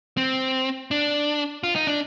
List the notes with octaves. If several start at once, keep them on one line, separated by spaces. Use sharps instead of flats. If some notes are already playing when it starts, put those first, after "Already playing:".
C4
D4
F4
D#4
D4